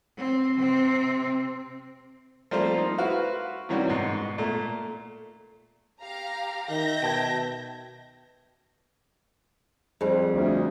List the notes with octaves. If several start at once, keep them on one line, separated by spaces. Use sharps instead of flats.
C4
C3 C4
F3 G3 A3 A#3 C4 C5
D#4
E4 F#4 B4 C5 F5
C3 D#3 E3 G3 C#4 F#4
G#2 B2
A#2 A3
G4 F5 A#5
D#3 E5 G6 A#6
B2 G5 A5 G#6
F2 G3 G#4
D2